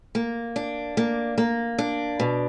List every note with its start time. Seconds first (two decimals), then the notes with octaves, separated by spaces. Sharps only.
0.15 A#3
0.56 D4
0.97 A#3
1.38 A#3
1.78 D4
2.20 B2